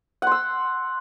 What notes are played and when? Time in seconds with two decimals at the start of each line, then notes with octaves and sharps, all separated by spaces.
0.22 F#5
0.27 C6
0.32 E6